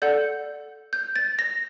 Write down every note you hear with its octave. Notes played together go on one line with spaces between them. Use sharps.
A4 D5 F#5 G6
G6
A6
A#6